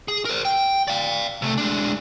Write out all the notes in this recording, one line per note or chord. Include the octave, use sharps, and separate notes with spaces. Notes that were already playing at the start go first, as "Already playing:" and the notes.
G#4
A#4 C5
G5
D5 F5
C3 A3
G#3 D4